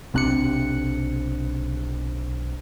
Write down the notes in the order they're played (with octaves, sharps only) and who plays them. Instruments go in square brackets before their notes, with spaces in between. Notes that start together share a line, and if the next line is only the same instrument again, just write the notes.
[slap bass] B1 C4 D4 [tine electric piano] C3 F#6 C#7